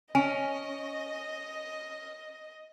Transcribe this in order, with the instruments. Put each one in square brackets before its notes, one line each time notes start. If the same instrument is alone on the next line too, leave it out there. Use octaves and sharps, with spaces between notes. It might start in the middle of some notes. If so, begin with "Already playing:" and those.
[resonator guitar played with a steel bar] C#4 [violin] D#5 [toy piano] G#5